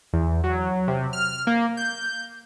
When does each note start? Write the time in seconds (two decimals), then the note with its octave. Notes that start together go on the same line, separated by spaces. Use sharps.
0.13 E2
0.44 F#3
0.88 C3
1.13 F6
1.47 A#3
1.77 G6